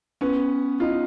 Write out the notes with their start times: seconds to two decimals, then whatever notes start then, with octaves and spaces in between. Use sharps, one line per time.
0.21 B3 C#4
0.80 D#4 F4